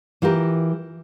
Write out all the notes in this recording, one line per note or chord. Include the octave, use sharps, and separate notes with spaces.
E3 F4 G4 A#4